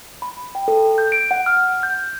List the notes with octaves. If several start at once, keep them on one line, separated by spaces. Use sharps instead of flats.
B5
G5
A4
G6
D7
F#5
F6
G6